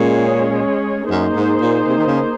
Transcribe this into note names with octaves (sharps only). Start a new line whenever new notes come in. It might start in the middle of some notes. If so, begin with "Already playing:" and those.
Already playing: A#2 G#3 C#4 G#4 C#5
F#2 A#3 D#4 G#4 C5
G#2
A#2
C3
D#3
C#3